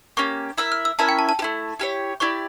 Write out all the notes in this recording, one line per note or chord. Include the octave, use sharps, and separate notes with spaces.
A#3 C#4 G4 C#6
E4 A#4 E5 E6
F6
E6
C#4 E4 A#4 E5 A5
G5
A5
A5
G4
A3 E4
E4 G4 C#5
E4 G4 D5 C#6